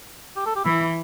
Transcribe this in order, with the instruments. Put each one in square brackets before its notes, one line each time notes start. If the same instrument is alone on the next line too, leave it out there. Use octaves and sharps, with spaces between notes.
[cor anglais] G4
A4
G4
[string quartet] E3 [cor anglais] E4